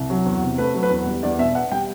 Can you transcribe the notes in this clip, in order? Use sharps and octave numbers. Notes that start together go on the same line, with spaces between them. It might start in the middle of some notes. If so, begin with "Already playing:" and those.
Already playing: C2
F#3
E2
C3
A3 B4
F#3
B4
E2
G3
E2 D5
B2 E5
B3 F#5
G3 G5